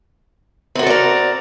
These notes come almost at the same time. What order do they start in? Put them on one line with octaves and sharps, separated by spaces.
C4 F#4 A4 D5 A#4